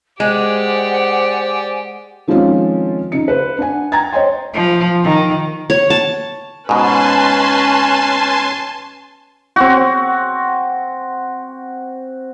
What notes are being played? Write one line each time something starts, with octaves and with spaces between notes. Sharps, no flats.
G#3 G4 C5 D5 F#5 G#5
D#3 F3 G#3 C4 C#4 F4
C#3 D#4 C#7
B4 C5
D4 F#5 G#5
G5 A#5 G#6 A6
C5 C#5 D#5 G5 C6
F3
D#3
C#5
A5
G#2 B2 C#4 B4 G#5 A5 C6
C4 F#4